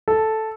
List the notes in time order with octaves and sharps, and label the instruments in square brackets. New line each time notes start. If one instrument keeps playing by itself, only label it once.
[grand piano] A4